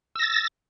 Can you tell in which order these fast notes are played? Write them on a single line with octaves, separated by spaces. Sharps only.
E6 A#6 A6